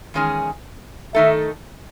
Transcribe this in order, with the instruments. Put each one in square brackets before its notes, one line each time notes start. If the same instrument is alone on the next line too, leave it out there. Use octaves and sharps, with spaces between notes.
[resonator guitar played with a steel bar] E2 D#3 G#3 C#4 G#4
[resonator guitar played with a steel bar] D#3 A3 D#4 A4 [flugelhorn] E5